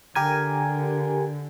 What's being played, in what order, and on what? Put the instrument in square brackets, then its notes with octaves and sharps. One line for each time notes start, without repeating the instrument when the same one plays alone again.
[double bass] D3 [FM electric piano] G4 A#4 G#5